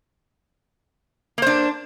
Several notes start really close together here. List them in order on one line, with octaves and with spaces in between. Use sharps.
A#3 C5 D4